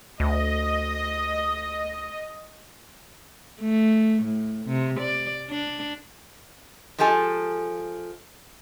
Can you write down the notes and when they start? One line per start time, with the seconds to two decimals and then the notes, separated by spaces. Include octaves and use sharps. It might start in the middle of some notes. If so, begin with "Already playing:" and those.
0.20 D2 D#5
3.61 A3
4.23 A2
4.66 C3
5.00 D5
5.49 D4
6.98 F3 G#3 G4 A4 G#5